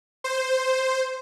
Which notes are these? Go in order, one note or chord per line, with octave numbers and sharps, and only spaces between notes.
C5